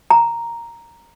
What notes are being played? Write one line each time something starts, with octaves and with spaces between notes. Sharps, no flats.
A#5